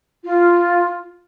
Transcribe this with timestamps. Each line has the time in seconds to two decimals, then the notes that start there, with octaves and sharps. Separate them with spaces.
0.23 F4